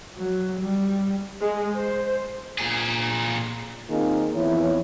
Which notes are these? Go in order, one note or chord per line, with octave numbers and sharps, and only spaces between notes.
F#3
G3
G#3
C5
A#2 G#4
D#3 A#3 C4 D#4 F4 G#4
F2 E3 B3 E4 C#5